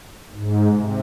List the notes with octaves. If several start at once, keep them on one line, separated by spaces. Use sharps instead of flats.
G#2
C3